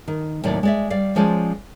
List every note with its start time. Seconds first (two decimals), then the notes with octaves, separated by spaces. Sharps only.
0.08 D#3
0.44 D#2 A2 C3 F#3 D5
0.63 G#3 D5 E5
0.90 G3 D5 F5
1.16 F3 G#3 C#4 F4 C5 D5